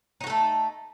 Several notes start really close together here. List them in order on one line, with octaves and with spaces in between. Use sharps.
D#4 F#4 A4 A3